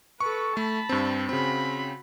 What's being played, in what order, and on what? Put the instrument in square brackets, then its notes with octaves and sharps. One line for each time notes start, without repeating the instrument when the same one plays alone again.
[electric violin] A4 B4 [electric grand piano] C#6
[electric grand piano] A3 [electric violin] A5 B5
[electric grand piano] G2 C4
[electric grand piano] C#3 C4 [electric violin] F#4 B5